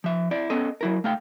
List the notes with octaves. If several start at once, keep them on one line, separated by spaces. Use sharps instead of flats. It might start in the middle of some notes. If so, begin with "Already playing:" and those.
F3 E5
E4 D5
B3 C#4 A4 D#5
F#3 E4 A#4
A3 F5 G5